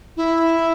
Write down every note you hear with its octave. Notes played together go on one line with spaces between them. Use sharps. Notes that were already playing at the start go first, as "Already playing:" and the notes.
E4